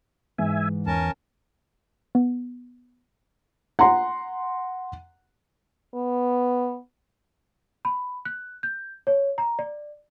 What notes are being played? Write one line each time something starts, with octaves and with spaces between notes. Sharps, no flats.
G#2 E3 E5 G#5
E2 C#4 A#4 A5
B3
F#5 A#5 C6
B3
B5
F#6
G6
C#5
A#5
D5